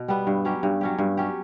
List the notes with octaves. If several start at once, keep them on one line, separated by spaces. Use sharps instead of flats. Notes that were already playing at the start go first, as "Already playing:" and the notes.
Already playing: B2
G3 B3
G2
F#3 C#4 G4
G2
F#3 C#4 G4
G2
F#3 C#4 G4